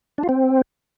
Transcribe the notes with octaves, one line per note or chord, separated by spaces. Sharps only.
D4
F4
C4